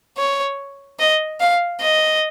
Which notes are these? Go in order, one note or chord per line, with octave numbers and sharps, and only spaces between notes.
C#5
D#5
F5
D#5